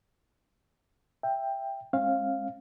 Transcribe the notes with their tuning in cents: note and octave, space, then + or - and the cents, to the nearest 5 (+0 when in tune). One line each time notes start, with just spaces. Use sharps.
E5 +5 G5 +10
G#3 +0 C#4 -45 F5 +0